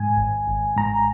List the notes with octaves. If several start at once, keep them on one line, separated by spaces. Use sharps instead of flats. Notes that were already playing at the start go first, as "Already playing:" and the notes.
Already playing: G#2 G#5
G#1
G#1
G#2 A#5